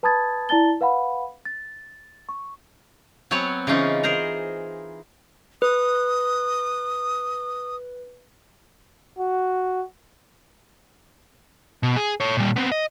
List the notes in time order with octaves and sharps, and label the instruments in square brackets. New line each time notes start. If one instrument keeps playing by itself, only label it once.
[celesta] B4 A5 B5 D#6 G#6 A6
E4 D5 A5 A6 G7
B4 F5 F#5 B5
A6
C#6
[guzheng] F#3 B3 C4 C#5 G#5
C#3 E3 C#4 D#4 F4
G#4 A#4 C5 A#5
[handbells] B4 [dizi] D#6
[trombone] F#4
[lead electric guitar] B2
G#4
A4 C#5
A#2 G3
B3 C4
D#5